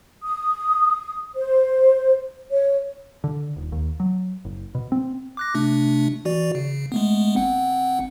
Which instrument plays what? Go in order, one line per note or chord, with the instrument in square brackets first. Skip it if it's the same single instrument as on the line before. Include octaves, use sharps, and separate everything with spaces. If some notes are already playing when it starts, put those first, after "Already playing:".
[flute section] D#6
C5
C#5
[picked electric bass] D3
D#1
D#2
F#3
F#1
B2
C4
[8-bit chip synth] D6 F#6 A#6
C3 A3 D4
E3 F#4 D5
C#3
G#3 A3 B3
G1 C4 F#5